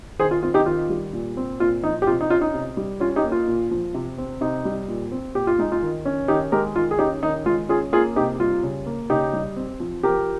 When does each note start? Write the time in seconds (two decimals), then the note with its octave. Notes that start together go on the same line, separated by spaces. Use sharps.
0.19 D#3 G#4 C5
0.31 F4
0.43 C4 F4
0.54 D#4 G4
0.66 D#3 F4
0.90 G3
1.13 A#2
1.37 C4
1.59 A#2 F4
1.83 F3 D#4
2.02 G4
2.07 C3 F4
2.21 D#4
2.30 C#4 F4
2.41 D#4
2.54 C3
2.77 G3
3.00 C#4 F4
3.16 D#4 G4
3.24 A#3
3.32 F4
3.47 A#2
3.71 F3
3.94 C3
4.18 C4
4.41 C3 D#4
4.65 G3
4.88 A#2
5.12 C4
5.35 A#2 G4
5.47 F4
5.59 G#3 D#4
5.72 F4
5.82 D#3
6.05 C#4
6.28 D#3 D#4 G4
6.52 G#3 G4 A#4
6.76 D#3 F4
6.91 G#4
6.99 C#4 D#4 G4
7.23 D#3 D#4
7.46 G#3 F4
7.69 C#4 F4 G#4
7.92 A#3 F4 G#4
8.16 C3 D#4 G4
8.40 G3 F4
8.63 C#3
8.86 A#3
9.10 C#3 D#4 G4
9.33 G3
9.56 C4
9.80 F3
10.03 F3 G4 A#4